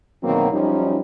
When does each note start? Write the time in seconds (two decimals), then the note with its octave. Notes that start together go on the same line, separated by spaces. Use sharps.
0.23 E2 B2 D#3 F#3 A#3 C4
0.52 F#2 F3 G3 C#4 D#4